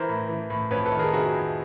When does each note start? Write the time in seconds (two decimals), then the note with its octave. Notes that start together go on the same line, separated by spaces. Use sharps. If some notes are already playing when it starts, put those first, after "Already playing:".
Already playing: E3 A#4 C5
0.09 A2
0.29 E3
0.50 A2
0.71 F2 B4 C#5
0.86 A4 B4
0.92 D#3
0.99 G#4 A#4
1.13 C3 F#4 G#4
1.34 F2